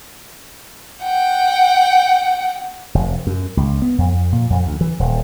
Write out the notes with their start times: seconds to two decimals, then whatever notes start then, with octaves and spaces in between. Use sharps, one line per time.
1.03 F#5 G5
2.95 F1
3.27 F#2
3.57 C#2
3.82 B3
3.98 F2
4.32 A#2
4.50 F2
4.66 D2
4.81 E3
4.99 D#1